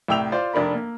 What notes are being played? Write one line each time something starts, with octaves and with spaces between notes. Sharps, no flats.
C2 A2 G5 E6 F7
F4 C5 D5
F1 D4 A#4 B5
A#3